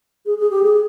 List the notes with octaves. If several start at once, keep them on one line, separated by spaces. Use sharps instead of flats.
G#4
G#4
G4
G#4